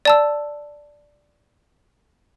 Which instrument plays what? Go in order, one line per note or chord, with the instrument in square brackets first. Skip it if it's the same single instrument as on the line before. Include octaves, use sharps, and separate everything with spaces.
[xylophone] D5 A5 E6